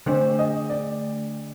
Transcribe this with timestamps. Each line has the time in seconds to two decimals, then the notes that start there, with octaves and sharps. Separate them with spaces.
0.06 D3 A3 D4 C5
0.39 D#5
0.70 D5